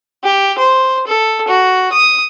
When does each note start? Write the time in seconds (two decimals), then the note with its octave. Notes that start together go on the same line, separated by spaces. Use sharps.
0.25 G4
0.58 C5
1.07 A4
1.48 F#4
1.93 D#6